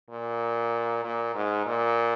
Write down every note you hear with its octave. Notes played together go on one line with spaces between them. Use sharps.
A#2
A#2
G#2
A#2